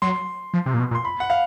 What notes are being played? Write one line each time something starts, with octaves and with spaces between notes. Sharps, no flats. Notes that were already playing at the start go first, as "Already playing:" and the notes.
F#3 C6
F3
C3
A#2
B2
A#2
C6
B5
F#5
F5